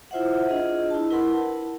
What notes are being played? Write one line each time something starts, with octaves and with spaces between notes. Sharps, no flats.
E4 F4 C5 E5 F#5
D4 F4 G#4 D#5
E4 A5
E4 A#4 B4 F#5 B5 C6
A5